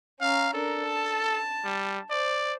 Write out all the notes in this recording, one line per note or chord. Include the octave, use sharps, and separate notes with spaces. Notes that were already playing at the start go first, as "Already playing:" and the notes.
C#4 F5 A#5
D4 A4 A#4
A5
G3
C5 D5